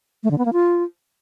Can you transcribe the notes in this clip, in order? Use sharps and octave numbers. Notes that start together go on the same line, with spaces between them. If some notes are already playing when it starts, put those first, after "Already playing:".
A3
D3
B3
A#3
F4